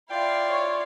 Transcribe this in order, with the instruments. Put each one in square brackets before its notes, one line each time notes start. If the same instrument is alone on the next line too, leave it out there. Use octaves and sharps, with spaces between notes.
[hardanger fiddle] E4 F5 [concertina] F4 D5 [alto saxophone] G5
[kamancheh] C#5